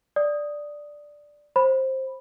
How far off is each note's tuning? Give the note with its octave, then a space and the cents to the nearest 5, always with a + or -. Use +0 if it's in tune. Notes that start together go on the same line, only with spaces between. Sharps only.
D5 +0 D#6 +0
C5 +15 B5 +0